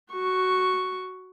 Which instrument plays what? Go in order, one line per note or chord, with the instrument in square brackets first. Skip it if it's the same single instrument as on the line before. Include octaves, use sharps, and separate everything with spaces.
[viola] F#4 C#6